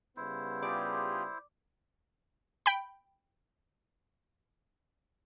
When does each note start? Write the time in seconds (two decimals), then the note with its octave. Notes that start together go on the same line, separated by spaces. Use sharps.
0.17 C#3 G3 B3 E4 C5
0.62 F4 G4 G#4 D5
2.66 G5 B5